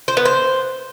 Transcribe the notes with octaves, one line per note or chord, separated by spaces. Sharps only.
C5
B3
C5